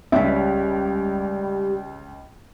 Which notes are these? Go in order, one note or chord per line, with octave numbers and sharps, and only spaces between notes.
C#2 G3 C#4 D5 E5